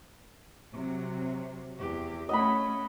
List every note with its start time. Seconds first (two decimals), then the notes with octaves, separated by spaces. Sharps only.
0.72 C3 F#3
1.78 E2 G4
2.29 A3 C#4 D#5 F#5 B5